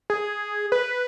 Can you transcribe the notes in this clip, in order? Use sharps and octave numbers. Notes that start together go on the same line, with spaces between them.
G#4
B4